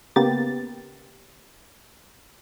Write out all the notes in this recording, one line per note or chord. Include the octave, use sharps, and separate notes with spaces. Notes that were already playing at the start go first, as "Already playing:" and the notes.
C#3 A#3 B3 G4 A6